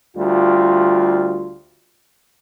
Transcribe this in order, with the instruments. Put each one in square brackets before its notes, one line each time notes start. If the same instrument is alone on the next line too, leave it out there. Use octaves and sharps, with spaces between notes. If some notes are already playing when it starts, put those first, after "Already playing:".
[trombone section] D2 G3 F4